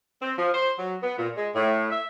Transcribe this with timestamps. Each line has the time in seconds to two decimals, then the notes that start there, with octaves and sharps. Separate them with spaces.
0.22 C4
0.38 F3
0.54 C5
0.79 F#3
1.03 B3
1.18 A#2
1.36 G#3
1.55 A2
1.91 E5